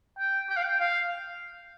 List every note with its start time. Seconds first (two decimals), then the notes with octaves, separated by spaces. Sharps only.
0.19 G5
0.49 G5
0.56 F5
0.64 G5
0.80 F5